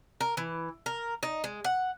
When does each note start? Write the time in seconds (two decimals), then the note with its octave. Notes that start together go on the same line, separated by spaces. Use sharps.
0.21 A#4
0.37 E3
0.86 A#4
1.23 D#4
1.44 G#3
1.65 F#5